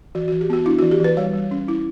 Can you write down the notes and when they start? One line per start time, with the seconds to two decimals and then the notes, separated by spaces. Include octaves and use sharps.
0.15 E3 F#4
0.28 F#4
0.32 E3
0.41 G4
0.50 B3 F#4
0.66 D4 E4
0.79 F#4
0.83 E3
0.91 G4
1.00 E3 B4
1.17 G3 C#5
1.34 G3
1.51 C#4
1.68 E4